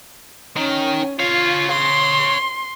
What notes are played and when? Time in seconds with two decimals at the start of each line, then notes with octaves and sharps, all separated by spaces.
0.56 D#3 C#4
1.20 F4 C#5 F5
1.72 C6